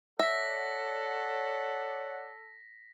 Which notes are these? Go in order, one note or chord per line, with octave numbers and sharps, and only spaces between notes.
A4 C#5 D5 E5 F#5 A#6 B6